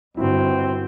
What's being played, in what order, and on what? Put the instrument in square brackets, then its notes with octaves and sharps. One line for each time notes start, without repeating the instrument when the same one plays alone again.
[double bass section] G1 [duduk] C4 [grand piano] E4 F#4